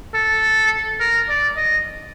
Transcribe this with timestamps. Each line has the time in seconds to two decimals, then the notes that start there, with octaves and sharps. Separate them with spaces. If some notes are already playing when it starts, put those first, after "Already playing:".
0.15 A4
1.00 A#4
1.29 D5
1.57 D#5